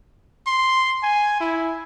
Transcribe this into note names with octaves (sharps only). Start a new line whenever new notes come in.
C6
G#5
E4